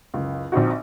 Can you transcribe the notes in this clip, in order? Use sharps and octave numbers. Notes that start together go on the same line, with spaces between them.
F#1 C#2
A#1 C4 D#4 F#4